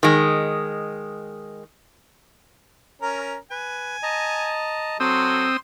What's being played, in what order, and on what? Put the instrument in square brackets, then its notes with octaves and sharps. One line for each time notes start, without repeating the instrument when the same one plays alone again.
[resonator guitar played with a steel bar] D#3 G#3
[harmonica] C#4 A#4 A#5
[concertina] B4 [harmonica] G#5
[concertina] D#5 A5 A#5
[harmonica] F#3 A4 [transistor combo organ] C4 D#6 E6 [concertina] C6